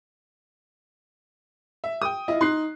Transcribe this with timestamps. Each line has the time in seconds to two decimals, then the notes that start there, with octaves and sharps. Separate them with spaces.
1.84 E5
2.02 G5 D#6
2.28 E4 F4 D#5
2.41 D#4 C6 F#6 C7